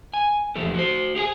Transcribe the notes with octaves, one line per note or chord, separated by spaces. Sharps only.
G#5
E2 F3 G4 A4
F#4 C5
G4 G#4 F#5 G#5